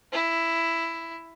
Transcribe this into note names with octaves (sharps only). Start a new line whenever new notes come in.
E4